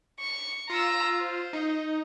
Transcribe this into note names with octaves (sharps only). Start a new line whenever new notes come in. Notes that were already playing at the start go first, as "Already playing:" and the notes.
C#6
F4 A#5 E6
C5
D#4